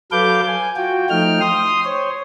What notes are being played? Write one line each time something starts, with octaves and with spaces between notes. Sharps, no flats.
F#3 A4 B4 F5 D6 G6
G#5
F4 F#4 G5
F3 A3 D#4 G5 F6
C6 D#6
C5 C#5